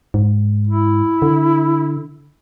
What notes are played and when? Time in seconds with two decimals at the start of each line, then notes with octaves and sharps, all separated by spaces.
0.14 G#2
0.67 E4
1.22 D3